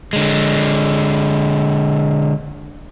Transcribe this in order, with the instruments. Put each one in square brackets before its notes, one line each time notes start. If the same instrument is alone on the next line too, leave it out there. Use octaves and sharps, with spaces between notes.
[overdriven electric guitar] D3 G#3